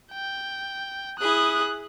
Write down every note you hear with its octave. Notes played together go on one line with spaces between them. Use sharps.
G5
E4 G#4 D#6 F#6